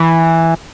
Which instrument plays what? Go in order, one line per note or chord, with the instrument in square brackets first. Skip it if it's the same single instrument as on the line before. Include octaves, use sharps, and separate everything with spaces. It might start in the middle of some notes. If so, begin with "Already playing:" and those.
Already playing: [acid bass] E3